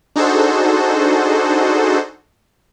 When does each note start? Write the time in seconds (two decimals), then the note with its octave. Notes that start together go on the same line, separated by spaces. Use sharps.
0.16 D4 D#4 F#4 G#4 A4 C5